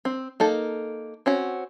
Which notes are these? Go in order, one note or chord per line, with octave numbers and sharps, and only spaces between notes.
C4
A#3 D#4 A4
C4 C#4 F#4